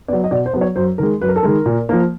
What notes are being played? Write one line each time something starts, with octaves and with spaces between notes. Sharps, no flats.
F#3 B3 D5
D#5
B2 D5
C5
F#3 B3
C#5
F#2 C5
D#3 G#3 A#4
F#2 B4
A#4
A4
D#3 G#3 A#4
A#2
F3 A#3